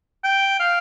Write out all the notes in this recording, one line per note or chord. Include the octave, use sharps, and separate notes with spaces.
G5
F5